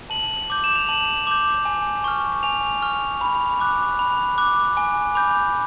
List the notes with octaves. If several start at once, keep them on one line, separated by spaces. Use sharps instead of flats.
A5 F#7
D6 G6
E7
F7
A5 F#7
D6 G6
G#5
C#6 F6
G#5 F7
C#6 F6
B5
D6 F#6
B5
D6 F#6
G#5
B5 D6 G6